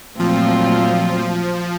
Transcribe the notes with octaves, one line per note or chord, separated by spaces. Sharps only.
A#2 F3 F#3 A3 C4 F4